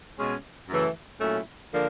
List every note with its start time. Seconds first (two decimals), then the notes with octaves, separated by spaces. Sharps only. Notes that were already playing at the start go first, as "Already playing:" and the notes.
0.17 B2 G#3 C#4
0.69 F#2 C#3 E3 A3
1.20 A#2 F#3 A3 C#4 E4
1.72 D3 F3 A#3 D4